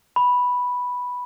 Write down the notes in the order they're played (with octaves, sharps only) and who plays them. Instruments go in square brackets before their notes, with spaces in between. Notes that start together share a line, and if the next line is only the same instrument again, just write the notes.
[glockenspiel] B5